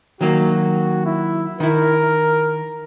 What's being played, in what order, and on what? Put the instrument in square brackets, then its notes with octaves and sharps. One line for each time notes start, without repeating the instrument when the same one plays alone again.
[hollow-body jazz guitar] D#3 F#3 A#3 [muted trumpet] F#4
[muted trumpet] E4
[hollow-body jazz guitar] D#3 E4 [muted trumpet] A#4